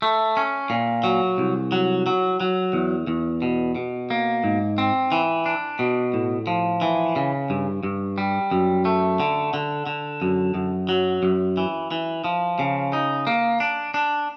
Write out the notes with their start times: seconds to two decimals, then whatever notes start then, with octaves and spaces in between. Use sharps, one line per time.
0.02 A3
0.37 C#4
0.70 A#2
1.04 F#3
1.38 C2
1.72 F#3
2.07 F#3
2.40 F#3
2.73 E2
3.07 E2
3.42 B2
3.75 B2
4.10 A#3
4.44 G#2
4.78 C4
5.12 E3
5.46 D4
5.79 B2
6.14 A2
6.47 F3
6.82 E3
7.16 C#3
7.50 G2
7.83 G2
8.18 G3
8.51 F#2
8.85 A3
9.20 D3
9.54 D3
9.87 D3
10.22 F#2
10.54 F#2
10.89 F#3
11.23 F#2
11.57 E3
11.91 E3
12.24 F3
12.59 C#3
12.93 D#4
13.27 A#3
13.60 D4
13.94 D4